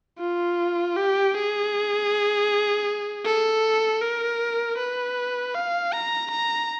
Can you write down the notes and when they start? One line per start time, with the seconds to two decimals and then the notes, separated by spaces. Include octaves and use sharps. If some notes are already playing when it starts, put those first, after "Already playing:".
0.19 F4
0.96 G4
1.34 G#4
3.25 A4
4.01 A#4
4.78 B4
5.54 F5
5.93 A#5
6.31 A#5